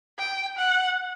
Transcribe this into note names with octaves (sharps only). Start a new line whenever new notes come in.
G5
F#5